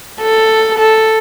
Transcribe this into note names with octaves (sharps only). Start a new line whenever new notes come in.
A4
A4